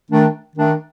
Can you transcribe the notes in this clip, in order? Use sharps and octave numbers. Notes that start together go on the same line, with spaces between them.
D#3 A3 D4
D#3 A3 D4